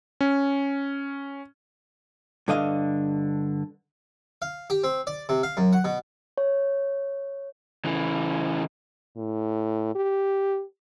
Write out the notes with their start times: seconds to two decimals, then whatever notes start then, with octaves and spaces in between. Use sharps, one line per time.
0.21 C#4
2.48 G2 D3 D#5 F5
4.42 F5
4.70 G4
4.84 C4
5.07 D5
5.29 C3
5.43 F5
5.57 F#2
5.73 F#5
5.84 B2
6.38 C#5
7.85 C#3 E3
9.17 A2
9.95 G4